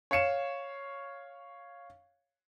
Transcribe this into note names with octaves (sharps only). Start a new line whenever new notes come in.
C#5 F5 C#7 E7